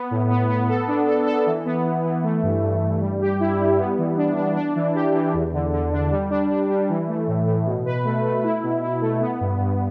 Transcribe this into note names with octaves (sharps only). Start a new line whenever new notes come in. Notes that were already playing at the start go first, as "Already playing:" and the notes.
Already playing: B3
A2
B3
B3
A4
D4
A4
A4
E3
B3
E3
E3
A3
G2
G2
G2
G3
G4
E4
G3
B3
E3
D4
D4
D4
E3
G4
E3
E2
D3
D3
D4
G3
D4
D4
G3
E3
A3
A2
A2
B2
B4
A3
A3
E4
B2
E4
A3
B3
G2
G2